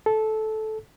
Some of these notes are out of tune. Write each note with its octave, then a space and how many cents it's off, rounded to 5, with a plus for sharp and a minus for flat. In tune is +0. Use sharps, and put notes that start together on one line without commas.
A4 -15